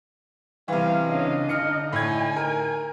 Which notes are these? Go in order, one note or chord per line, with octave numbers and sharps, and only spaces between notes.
C3 E3 G3 F5
C#2 C#4 D4 D#5 F5
D3 D#4 F6 C#7
A2 G#5 G#6
A#4